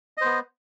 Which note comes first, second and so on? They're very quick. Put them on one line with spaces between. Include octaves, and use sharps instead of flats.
D#5 C5 B3